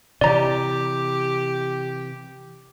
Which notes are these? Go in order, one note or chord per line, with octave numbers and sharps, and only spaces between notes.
C3 E3 G4 D5 A#5